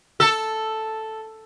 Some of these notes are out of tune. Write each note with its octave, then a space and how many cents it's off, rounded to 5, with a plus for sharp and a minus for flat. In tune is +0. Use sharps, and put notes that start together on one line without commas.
A4 +0